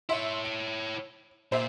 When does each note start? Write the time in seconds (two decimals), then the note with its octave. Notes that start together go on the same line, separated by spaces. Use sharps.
0.09 E4 C#5 E5 C6
0.45 D7
1.52 A#2 C5 E5